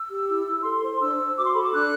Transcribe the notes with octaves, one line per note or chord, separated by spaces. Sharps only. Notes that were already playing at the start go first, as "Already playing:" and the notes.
Already playing: E6
G4
E4
E4
A4 C6
C5
D4 E6
C5
F#4 D6
C6
A4 B5
D6
D4 F#6